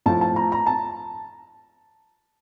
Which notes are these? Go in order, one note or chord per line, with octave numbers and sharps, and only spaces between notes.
A2 F3 A5
A5
A#5
A#5
A5